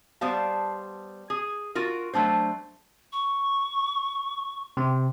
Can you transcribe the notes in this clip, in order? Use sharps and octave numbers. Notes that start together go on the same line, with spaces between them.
G3 B3 C5 F5 A5
G#4
F4 F#4 A#4
F#3 A3 D4 C5
C#6
C3 C4